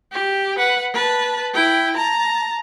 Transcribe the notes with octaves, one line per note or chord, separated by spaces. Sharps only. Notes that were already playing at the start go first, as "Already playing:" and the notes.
G4
B4 F#5
B4 A5
E4 G5
A5 A#5